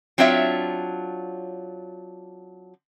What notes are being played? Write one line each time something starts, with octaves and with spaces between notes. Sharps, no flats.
F#3 C4 D4 F4 C#5 E5